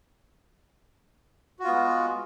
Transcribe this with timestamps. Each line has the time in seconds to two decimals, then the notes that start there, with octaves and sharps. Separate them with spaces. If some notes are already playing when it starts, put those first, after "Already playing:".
1.59 F#4
1.63 F4
1.67 B3
1.72 G#3